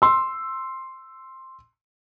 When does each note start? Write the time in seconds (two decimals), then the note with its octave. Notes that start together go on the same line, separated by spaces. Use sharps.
0.02 C6 E6